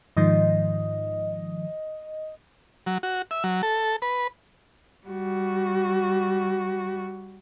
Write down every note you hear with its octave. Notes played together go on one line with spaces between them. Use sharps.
G#2 D#3 F3 D#5
F#3
F#4
E5
F#3
A4
B4
G3 F#4